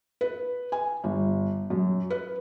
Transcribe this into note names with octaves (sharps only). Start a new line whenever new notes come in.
B4
G#5
G1
F#2
B4